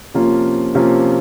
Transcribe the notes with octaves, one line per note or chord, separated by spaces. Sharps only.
C3 F3 A#3 C#4 F4
C3 F3 A#3 C#4 F4